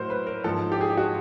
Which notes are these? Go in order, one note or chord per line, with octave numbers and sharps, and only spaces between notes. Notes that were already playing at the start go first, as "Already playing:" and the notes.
Already playing: A2 F#3 A#4 C5
B4
A#4
G#2 F3 A4
G4
G#4
G4
F#4